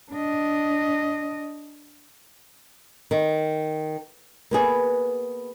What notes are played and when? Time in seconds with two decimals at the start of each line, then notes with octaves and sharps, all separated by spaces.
0.11 D4 D#5
3.11 D#3
4.51 A#3 B3 G#4